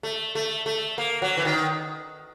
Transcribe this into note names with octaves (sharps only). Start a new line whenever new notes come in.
A3
A3
A3
A#3
F#3
E3
D#3